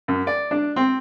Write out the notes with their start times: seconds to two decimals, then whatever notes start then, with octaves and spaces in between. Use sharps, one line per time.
0.08 F#2
0.27 D5
0.51 D4
0.76 C4